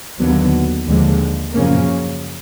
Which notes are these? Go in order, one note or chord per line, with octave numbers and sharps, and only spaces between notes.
D#2 D3 F#3 B3
D#2 D3 F3 G#3
F#2 C#3 F3 A#3 C#4